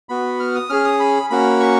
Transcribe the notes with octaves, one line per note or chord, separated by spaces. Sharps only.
B3 F#4 B5
F6
D#6
C#4 G#4 F6
D#6
B5
A#3 C#4 F#4 B5
C#6